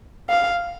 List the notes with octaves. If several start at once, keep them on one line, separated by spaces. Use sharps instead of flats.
F5